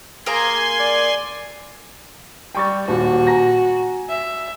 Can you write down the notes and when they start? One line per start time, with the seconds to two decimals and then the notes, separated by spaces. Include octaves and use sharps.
0.26 A#3 G#4 G#5 A#5 C6
0.79 D5
2.55 G3 G5 C#6 A6
2.88 D#1 D#2 F#4 G4
3.27 G#5 A#5 A#6
4.09 E5